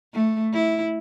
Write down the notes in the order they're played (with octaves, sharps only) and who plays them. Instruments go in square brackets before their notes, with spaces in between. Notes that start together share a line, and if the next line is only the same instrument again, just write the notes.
[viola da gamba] A3
E4